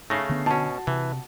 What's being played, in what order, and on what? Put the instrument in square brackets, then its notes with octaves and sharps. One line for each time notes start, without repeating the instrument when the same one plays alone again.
[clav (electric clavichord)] C#3 A3 [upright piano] A#6 C7
[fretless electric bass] D3 B3
[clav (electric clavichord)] B2 C#4 [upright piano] F#4 A5
[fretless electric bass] C3 [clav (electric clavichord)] E3